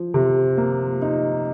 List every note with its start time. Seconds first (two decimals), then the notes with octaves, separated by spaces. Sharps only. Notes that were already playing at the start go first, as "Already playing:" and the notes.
Already playing: F3
0.14 C3
0.58 A#3
1.02 D#4